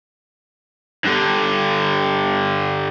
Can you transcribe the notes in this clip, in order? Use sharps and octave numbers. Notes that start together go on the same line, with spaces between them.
G2 D3